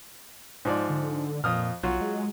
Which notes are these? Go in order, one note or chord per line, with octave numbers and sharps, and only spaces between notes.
G#2 F3 D5
D3
F2 A#2 D#6 F6
B1 F#3 F4 F#4
G#3